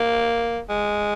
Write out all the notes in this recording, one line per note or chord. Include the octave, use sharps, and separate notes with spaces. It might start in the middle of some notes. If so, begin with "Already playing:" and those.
Already playing: A#3
G#3